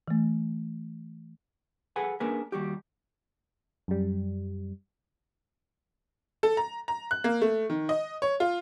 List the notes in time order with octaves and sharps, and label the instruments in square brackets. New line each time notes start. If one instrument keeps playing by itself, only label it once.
[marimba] E3 A3
[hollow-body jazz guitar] G#4 A4 B4 F#5 G#5
A#3 C#4 D4 G#4 A#4 B4
D#2 G3 F#4 G4
[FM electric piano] F#2 G3
[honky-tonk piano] A4
A#5
A#5
F#6
A#3
A3
D#3
D#5
C#5
F4